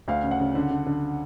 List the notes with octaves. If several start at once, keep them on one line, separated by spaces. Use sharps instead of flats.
D2 F5
C#3
F#5
C#3
D3
D3
D3